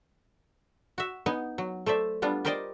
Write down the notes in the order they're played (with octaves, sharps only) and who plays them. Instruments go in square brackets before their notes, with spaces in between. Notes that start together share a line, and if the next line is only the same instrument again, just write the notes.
[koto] F#4 E5
B3 D#4 G#5
F#3
A3 C5 D5 E5
G3 B3 D4 F4
G4 A#4 C5 D5 D#5 G5